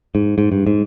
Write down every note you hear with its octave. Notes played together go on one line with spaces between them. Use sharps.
G#2
G#2
G2
G#2